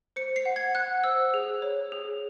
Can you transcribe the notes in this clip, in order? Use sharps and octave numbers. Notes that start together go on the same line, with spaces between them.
C5 C#7
C7
F#5
G#6
F#5 F#6
C5 E6
G#4
C#5
G#4